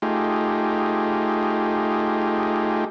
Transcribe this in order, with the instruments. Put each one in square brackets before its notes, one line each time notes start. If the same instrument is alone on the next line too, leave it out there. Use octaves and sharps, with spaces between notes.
[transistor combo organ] A3 D#4 F4 G4 G#4